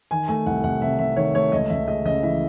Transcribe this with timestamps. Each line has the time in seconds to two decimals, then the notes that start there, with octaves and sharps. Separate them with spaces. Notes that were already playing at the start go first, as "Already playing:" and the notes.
0.11 D#3 G#5
0.28 A3 G#5
0.46 C2 F#5
0.64 C2 F#5
0.82 C3 E5
0.99 C3 E5
1.17 D#3 C#5
1.35 A3 C#5
1.52 C#2 D#5
1.70 C#2 E5
1.88 G#3 D#5
2.05 C#3 D#5
2.23 E3 E5